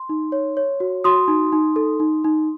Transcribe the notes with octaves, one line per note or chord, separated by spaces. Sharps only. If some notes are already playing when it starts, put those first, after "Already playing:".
Already playing: C6
D#4
C#5
C#5
F#4
F#4 C6 D#6
D#4
D#4
A4
D#4
D#4